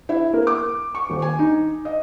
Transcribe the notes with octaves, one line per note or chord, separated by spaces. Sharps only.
E4
A#3
D6
C#6
D#1
G#5
D#4
D#5